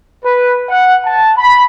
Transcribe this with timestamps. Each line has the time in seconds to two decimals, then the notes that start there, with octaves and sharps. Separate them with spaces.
0.24 B4
0.69 F#5
1.05 A5
1.37 B5